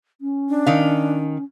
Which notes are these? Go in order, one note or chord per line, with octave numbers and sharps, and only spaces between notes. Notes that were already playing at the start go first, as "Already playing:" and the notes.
C#4
D4
D#3 F5